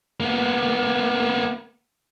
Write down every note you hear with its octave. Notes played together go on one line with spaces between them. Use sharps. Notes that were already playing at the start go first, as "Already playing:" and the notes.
A#3 B3